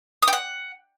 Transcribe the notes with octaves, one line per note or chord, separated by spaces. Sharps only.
D#6
G5
F#5